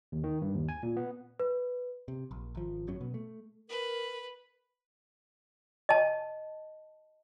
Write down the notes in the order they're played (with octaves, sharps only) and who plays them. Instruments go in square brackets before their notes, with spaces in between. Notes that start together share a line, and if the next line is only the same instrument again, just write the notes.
[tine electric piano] D#2
D#3
G2
D#2
G#5
A#2
B3
[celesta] B4
[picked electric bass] C3
A#1
G#1 F3
G#1 F#2 F#3 C#4
B2 B3
A3
[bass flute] A#4 [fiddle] B4
[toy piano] D#5 A5